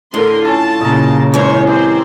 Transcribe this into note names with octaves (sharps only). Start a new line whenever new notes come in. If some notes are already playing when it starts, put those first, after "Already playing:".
A2 D3 A#4 C6
C#4 F4 A4 A5
A#2 C#3 D#5 A#5
E3 G#3 C#4 A#4 C5 C#5
C4 G4 C5